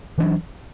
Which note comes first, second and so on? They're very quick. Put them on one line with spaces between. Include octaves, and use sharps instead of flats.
E3 D4 F#3